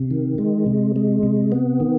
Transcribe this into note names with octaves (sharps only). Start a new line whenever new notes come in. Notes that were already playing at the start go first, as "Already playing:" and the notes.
Already playing: C3
D#3
G#3
C3
G#3
C3
B3
D#3